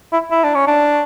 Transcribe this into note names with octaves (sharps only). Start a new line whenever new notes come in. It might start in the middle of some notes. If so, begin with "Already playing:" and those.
E4
E4
D4
C#4
D4